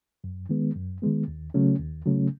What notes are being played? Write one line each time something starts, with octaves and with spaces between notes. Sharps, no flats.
F#2
D#3 G#3 B3
F#2
D#3 G#3 B3
D#2
C#3 F#3 A3 C#4
D#2
C#3 F#3 A3 C#4